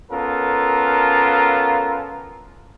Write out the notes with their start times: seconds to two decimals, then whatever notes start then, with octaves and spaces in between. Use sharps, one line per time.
0.11 B3 C#4 F4 A4 A#4